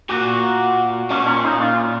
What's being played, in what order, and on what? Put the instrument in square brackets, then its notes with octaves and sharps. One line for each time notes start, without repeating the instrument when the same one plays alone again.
[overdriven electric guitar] A#2 [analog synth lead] F#4
[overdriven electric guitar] A#2 [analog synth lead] C#4
[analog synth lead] C#4
D#4
F4